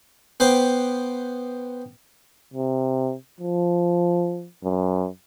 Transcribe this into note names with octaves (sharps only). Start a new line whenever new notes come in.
B3 C5 G5 D6
C3
F3
F#2